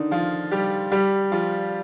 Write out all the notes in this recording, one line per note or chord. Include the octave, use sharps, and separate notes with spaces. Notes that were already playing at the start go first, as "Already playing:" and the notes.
Already playing: D3 D#3 D4 D#4
F3 F4
G3 G4
G3 G4
F3 F4